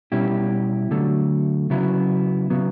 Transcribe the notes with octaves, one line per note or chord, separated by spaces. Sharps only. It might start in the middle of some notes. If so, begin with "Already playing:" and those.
B2 G3 C#4 E4 G4
D3 F#3 A3
C#3 F#3 B3 E4
C#3 F#3 B3